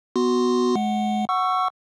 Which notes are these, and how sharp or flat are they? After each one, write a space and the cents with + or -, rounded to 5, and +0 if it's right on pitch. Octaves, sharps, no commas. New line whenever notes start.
B3 +0 F#4 +0 C6 +0
G#3 +35 F#5 +0
F#5 +0 C#6 +0 E6 +20